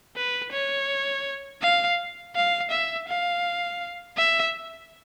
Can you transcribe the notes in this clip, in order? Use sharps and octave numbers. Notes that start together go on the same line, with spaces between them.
B4
C#5
F5
F5
E5
F5
E5